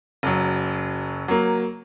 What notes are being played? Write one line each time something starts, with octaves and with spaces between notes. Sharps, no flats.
F#1 F#3
F#3 A#3